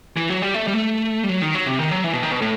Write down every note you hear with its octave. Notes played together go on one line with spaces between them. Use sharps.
E3
F#3
G3
A3
G3
A3
G3
F#3
D#3
F#3
C3
D#3
F#3
E3
B2
D#3
B2
A2